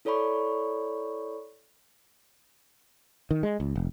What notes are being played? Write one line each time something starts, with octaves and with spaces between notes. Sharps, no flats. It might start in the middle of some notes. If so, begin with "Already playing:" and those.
E4 A4 C#5 D5 B5 C#6
D#3
G#3
C#2
F1